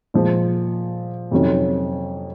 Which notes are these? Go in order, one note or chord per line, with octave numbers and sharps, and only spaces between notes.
A#2 F3 G#3
F2 C3 D#3 F#3 C#4